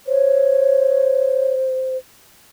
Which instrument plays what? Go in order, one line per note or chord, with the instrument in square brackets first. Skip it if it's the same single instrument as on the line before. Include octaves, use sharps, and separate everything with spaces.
[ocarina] C5 [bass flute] C#5